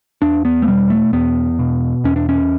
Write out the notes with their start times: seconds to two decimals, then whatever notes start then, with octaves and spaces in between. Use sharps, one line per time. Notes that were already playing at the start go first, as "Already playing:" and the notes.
0.22 E2 D4
0.45 B3
0.62 A3
0.67 B2 G3
0.90 A3
1.13 E2 B3
1.59 B2
2.04 E2 C#4
2.16 D4
2.29 C#4